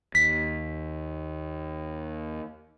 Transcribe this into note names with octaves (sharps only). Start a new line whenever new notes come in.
D#2 B6